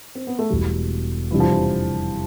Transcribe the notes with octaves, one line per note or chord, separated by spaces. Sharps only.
C4
B3
A3
E1 E2 B2 G3
F2 C3 E3 G3 D4 G4
F3
E3